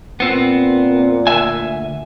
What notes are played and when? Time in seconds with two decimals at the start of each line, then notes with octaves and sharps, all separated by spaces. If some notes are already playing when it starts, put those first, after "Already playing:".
0.20 A#2 B3 C4
1.27 D2 E5 G#5